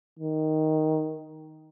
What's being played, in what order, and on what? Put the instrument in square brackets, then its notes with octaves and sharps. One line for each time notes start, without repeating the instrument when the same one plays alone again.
[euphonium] D#3